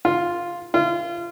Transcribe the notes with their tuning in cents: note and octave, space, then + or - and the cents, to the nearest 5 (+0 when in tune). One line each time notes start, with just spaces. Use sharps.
F4 +0
F4 -25